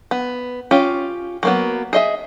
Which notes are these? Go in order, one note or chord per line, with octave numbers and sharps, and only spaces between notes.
B3
C#4 F4 G4
F#3 A#3 B3
G#4 D#5 E5